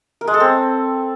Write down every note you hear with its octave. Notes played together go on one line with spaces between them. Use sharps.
A#4
G#3
A4
C4